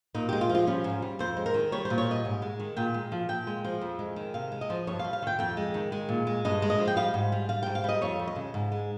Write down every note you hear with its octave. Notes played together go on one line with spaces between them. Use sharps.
A#2 D#4
G#3 G4
F4
F3
F4
G3 C#4
G#2
G3
F2 C5
G#3
A#4
D#3
G3 C#5
C5
A#2
C#5
G3 D#5
G#2
G#3
D#3
A#2 G5
G#3
F3
A#2 G5
G#3
F3
F2
G#3
D#3
C3 F5
G#3
D#5
F3
G2 C#5
F5
G3
F5
D#3 G5
F2 G5
G#3
D#3
G#3
A#2
G#3
G2 D#5
G#3
D#5
F3
G5
G3 F5
G#2
G3
G3 F5
G#2 G5
F5
G3 D#5
F2 C#5
G3
D#5
C#3
G#2
G#3